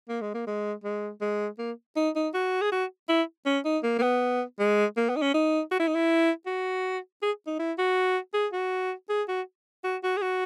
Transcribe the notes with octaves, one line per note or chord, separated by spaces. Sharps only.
A#3
G#3
A#3
G#3
G#3
G#3
A#3
D#4
D#4
F#4
G#4
F#4
E4
C#4
D#4
A#3
A#3
B3
G#3
A#3
B3
D#4
C#4
D#4
F#4
E4
D#4
E4
F#4
G#4
D#4
E4
F#4
G#4
F#4
G#4
F#4
F#4
F#4
G#4
F#4